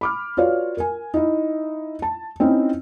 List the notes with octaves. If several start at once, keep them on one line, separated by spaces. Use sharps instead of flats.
B5 D6 F6
F4 F#4 B4 C#5 D5 F5
A#4 G#5
D#4 E4
A5
C4 C#4 D#4 E4